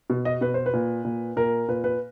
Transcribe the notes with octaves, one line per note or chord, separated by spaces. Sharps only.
B2
D#5
B2 B4
C5
B4
A#2
A#2
A#2 A#4
A#2 B4
B4